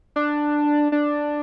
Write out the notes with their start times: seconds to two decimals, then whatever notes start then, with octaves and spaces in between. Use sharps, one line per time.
0.16 D4
0.92 D4